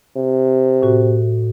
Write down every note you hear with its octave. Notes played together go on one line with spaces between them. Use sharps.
C3
A2 F#4